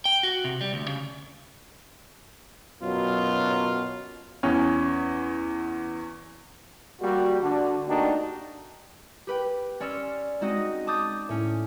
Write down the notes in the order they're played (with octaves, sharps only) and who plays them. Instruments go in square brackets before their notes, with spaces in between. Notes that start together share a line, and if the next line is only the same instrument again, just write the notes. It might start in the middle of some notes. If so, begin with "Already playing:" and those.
[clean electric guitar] G5
F#4
C3
G3
D2
C#3
[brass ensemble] F#2 B2 F#3 [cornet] F4
[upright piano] E2 C#4
[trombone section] G3 A#3 F#4
D3 D4 F#4
A3 A#3 D4 D#4 F#4 G4
[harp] G4 B4 G5
C#4 D5 C6 E6 F6 C#7
G#3 C4 D#4 F#4 D#5
A5 D6 D#6 G6 A6
A2 C#4